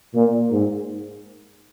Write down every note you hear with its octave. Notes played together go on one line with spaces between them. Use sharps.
A#2
G#2